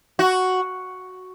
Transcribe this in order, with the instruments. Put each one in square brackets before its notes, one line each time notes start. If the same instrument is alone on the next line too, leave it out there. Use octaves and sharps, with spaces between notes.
[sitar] F#4